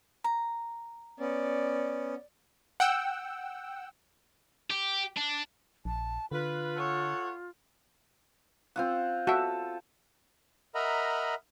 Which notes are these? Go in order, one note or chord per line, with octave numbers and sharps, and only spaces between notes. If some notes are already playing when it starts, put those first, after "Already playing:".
A#5
B3 C#4 D5
F#5 G5 E6
G4
D4
A#1 A5
D3 F4 B4
A4 C#5 F#5
C4 F4 F#5
F#4 A4 E5
A#4 D#5 E5 F#5 A#5 B5